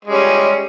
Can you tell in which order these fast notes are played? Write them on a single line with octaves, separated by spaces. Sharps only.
G#3 G3 C#4